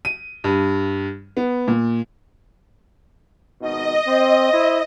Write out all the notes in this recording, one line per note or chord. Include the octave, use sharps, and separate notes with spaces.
D#7
G2
B3
A#2
G#1 B2 D#4 D#5
C4
E4 C5